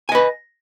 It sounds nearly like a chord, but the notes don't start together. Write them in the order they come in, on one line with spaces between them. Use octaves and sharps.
G#5 D#5 B4